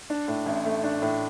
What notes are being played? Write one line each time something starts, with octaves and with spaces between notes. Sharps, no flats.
D4
A2
A1
A3
D4
A2